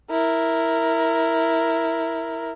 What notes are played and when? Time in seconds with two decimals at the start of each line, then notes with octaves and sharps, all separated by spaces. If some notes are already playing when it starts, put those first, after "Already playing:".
0.10 E4 A#4